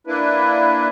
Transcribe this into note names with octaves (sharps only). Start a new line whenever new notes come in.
A#3 D4 E4 B4